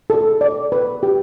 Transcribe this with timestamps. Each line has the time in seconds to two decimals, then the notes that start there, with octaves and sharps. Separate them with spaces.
0.10 A4
0.41 D5
0.72 B4
1.03 G4